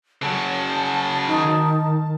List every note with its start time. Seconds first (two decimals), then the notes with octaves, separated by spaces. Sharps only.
0.22 C#3 F#3 A5
1.27 D#3 D#4